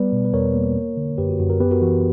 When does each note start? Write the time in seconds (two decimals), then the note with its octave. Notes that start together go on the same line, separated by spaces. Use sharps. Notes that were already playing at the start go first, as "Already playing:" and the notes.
Already playing: G3 B3 B4 D5
0.13 B2
0.25 B4
0.33 E2 A#4 C#5
0.54 A#3
0.76 A#3
0.97 D3
1.18 F#2 G4 B4
1.29 F#4
1.39 F#2 F#4
1.50 F#4 A#4
1.60 B3 G4 B4
1.71 F#4 A#4
1.81 E3 F#4